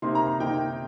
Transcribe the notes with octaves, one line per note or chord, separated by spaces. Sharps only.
C3 D#3 A#3 D#4 C6
A#5
A#5
C3 D#3 A#3 D#4 G5